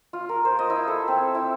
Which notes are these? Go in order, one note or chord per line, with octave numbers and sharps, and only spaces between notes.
F4
A#4
C5
D#5
E4
A4
C4
E4